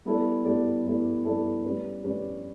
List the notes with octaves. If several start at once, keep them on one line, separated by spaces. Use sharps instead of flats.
G3 B3 E4 A4 D5
G3 B3 E4 A4 D5
G3 B3 E4 A4 D5
G3 B3 E4 A4 D5
G3 C#4 G4 B4 D5
G3 C#4 G4 B4 D5